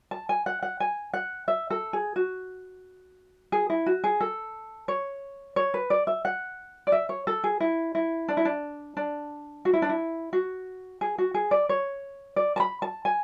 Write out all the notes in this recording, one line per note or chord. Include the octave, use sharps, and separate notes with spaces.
A5
G#5
F#5
F#5
G#5
F#5
E5
A4
G#4
F#4
G#4
E4
F#4
G#4
A4
C#5
C#5
B4
D5
E5
F#5
D5
E5
C#5
A4
G#4
E4
E4
D4
E4
D4
D4
F#4
E4
D4
E4
F#4
G#4
F#4
G#4
D5
C#5
D5
A5
B5
A5
G#5